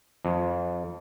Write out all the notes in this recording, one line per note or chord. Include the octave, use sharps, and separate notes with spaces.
F2